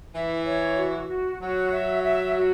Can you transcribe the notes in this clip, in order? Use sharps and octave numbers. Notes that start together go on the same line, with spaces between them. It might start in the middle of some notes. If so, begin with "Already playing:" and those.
E3 E5
C#5
F#4
F#4
F#3 F#4
E5
E5
F#4